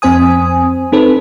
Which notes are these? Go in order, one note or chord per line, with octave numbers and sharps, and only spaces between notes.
F2 C4 C5 G#5 D#6
C4 D#4 A4 B4 C5